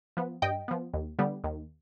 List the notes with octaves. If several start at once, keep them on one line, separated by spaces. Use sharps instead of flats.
F3 B3
G2 D#5 G5
F3 B3
D#2
D3 G3 B3
D#2